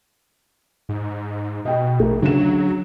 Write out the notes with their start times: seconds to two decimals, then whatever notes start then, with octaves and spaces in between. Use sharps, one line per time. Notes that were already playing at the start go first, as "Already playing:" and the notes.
0.89 G#2
1.65 B2 D#5 G5
2.00 A#1 A3 A#4
2.22 D2 C#3 F#3 E7